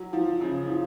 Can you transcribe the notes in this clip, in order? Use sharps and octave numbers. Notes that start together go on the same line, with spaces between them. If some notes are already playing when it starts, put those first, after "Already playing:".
Already playing: F#3
F3
C#3
F3